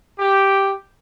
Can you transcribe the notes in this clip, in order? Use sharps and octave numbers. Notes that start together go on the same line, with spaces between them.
G4